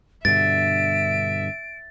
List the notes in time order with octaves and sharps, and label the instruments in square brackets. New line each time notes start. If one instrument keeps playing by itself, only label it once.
[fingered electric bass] G2 B2 D3 [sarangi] E5 [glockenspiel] A6 [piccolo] D7